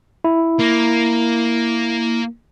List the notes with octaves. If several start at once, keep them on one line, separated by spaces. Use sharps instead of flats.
E4
A#3